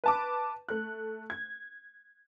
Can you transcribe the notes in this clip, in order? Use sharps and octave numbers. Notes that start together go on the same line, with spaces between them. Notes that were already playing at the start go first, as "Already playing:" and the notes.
B4 A5 D6
A3 F#6
G#6